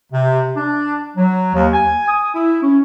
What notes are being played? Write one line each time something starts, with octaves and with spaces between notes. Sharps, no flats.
C3
D4
F#3
D#2
G#5
D#6
E4
C#4